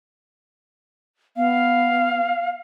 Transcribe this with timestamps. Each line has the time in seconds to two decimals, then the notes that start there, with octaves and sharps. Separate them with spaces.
1.37 B3 F5